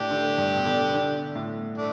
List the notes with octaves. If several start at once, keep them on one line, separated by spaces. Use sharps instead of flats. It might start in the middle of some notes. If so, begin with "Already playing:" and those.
Already playing: A2 D3 D4 G4
D3
G2
B2
D3
D3
A2
A3 D4